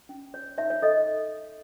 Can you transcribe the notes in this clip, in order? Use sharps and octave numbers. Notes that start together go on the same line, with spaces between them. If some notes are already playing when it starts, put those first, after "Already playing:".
C#4
C#5
D#4 C#5 E5
C#5
A4 D#5